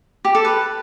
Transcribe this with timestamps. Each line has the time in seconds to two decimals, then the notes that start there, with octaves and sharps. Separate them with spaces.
0.25 G4
0.35 A4
0.45 B4